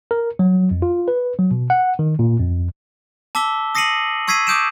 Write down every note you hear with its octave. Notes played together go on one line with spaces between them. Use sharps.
A#4
F#3
F2
F4
B4
F#3
B2
F#5
D#3
A#2
F2
A5 D6 E6 B6 G7
D#6 A#6 C7 C#7 D#7 F#7
C#6 E6 G#6 B6 C7 D#7
D6 D#6 G6 D7 E7